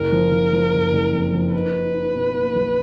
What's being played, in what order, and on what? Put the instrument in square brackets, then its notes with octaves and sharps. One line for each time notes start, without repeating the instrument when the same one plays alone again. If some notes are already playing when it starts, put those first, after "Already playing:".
Already playing: [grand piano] F#1 [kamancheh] A#4
[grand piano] F3
F3
F3
F#1
F#1
F2
F3
[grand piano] D#4 [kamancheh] B4
[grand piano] D#4
D#4
B2
A#3
B1